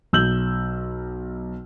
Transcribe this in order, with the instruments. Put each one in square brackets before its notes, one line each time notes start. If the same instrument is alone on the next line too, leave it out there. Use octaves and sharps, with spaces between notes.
[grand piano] B1 E6 G6 F#7